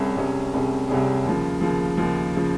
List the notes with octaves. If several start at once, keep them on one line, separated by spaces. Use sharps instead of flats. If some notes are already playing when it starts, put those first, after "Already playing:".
Already playing: C2 C3 G3 C#4 G#4
C2 C3 G3 C#4 G#4
C2 C3 G3 C#4 G#4
C2 C3 G3 C#4 G#4
D#2 C#3 F3
D#2 C#3 F3
D#2 C#3 F3
C#3 F3